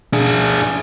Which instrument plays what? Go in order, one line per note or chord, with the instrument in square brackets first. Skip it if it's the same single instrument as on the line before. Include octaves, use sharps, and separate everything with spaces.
[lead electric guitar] D4 G#4